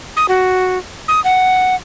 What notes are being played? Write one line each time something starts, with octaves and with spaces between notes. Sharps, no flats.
D#6
F#4
D#6
F#5